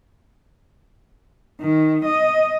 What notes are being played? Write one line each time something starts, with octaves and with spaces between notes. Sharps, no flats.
D#3
D#5